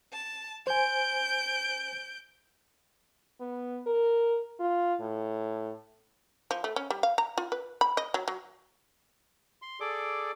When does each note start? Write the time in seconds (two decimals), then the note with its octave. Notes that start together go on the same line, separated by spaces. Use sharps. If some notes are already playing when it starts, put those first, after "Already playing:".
0.13 A5
0.67 C5 G#5 G6 D7
3.40 B3
3.87 A#4
4.60 F4
5.01 A2
6.51 F3
6.64 A3
6.76 C#4
6.90 G3
7.03 F5
7.18 A#5
7.38 F4
7.52 B4
7.81 B5
7.97 D#5
8.14 F#3
8.28 F#3
9.62 C6
9.80 G#4 A4 D5 D6